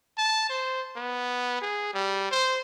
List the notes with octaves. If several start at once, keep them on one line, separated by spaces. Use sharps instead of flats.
A5
C5
B3
G#4
G3
C5